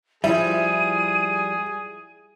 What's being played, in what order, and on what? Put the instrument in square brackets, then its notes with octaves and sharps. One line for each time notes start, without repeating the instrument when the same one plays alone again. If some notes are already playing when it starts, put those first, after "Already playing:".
[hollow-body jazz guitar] F3 G3 [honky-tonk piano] E4 [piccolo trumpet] G#4 [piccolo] D#7